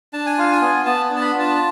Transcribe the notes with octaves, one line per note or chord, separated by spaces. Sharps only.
D4 A5
G#5
F4 F5
G#5
B3
B3 A5
D4
A5
B5
F4
A5